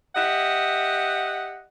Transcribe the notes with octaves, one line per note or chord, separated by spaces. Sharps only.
G4 D#5 E5 F#5